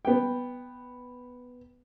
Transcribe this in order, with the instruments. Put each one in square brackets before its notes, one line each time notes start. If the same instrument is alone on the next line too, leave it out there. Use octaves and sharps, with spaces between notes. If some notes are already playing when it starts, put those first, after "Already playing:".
[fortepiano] B3 G5